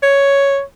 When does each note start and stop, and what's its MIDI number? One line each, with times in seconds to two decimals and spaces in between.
0.03 0.62 73